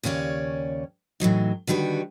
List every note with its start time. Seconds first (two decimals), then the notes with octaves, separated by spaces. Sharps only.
0.03 D#2 C#3 C#4 C#5 D5
1.20 A2 E3 F#3 D#4
1.67 D3 D#3 G3 F#4 B4